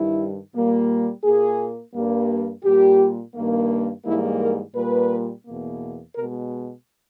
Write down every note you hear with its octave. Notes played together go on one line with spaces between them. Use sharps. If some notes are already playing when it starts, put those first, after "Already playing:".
Already playing: G2 D#3 G3 E4
A#2 G3 A#3
A#2 A#3 G#4
G2 G3 A#3
A#2 G3 A#3 G4
G2 D#3 A#3
G#2 E3 G3 A#3 E4
A#4
A#2 G3 A#3 B4
E2 B2 A#3
B2 G#3 A#4